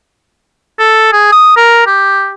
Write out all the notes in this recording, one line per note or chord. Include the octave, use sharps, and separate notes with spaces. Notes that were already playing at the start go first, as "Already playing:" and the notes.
A4
G#4
D#6
A#4
G4